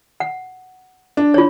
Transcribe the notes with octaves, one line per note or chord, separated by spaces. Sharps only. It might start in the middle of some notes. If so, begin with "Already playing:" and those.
F#5
D4
F4 C#5